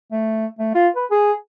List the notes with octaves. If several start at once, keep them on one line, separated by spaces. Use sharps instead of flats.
A3
A3
F4
B4
G#4